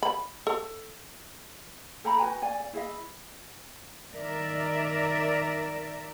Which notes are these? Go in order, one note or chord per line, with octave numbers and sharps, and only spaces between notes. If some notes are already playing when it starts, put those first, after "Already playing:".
B5
A4
A4 G5 A#5 B5
F#4 B4 G5 G#5
D5 G#5
D5
E4 G#4 D#5 E5
D#3 A#4 D5 E5